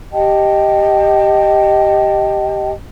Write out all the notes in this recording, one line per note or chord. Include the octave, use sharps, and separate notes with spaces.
G4 D#5 G5 A5